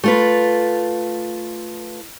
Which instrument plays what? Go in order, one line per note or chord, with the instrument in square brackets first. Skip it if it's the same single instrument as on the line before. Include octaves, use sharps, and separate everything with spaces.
[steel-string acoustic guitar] A3 F4 B4